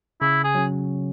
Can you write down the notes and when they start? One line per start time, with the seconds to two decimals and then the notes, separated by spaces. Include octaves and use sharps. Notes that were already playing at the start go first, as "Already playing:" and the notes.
0.21 C#3 E4
0.44 G#4
0.55 F#3 C#4